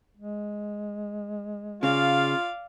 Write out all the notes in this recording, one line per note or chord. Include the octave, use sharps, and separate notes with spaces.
G#3
C#3 F4 D5 F5